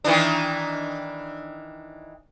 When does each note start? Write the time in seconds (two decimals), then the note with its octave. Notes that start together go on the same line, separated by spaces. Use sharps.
0.04 D#3 E3 D4